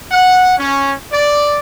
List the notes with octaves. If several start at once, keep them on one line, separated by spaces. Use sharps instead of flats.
F#5
C#4
D5